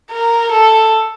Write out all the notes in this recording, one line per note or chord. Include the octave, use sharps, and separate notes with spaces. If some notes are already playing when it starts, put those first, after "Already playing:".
A#4
A4